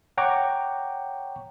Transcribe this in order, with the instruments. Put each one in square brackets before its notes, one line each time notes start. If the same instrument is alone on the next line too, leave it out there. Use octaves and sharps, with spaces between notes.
[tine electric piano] C#5 F#5 G5 A#5 C#6 D6